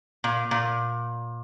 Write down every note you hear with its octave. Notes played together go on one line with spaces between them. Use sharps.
A#2
A#2